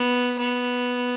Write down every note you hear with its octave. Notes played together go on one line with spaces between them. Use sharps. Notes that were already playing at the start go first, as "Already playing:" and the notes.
Already playing: B3
B3